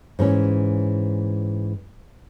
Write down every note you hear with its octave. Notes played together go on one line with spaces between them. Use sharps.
G#2 E3 C#4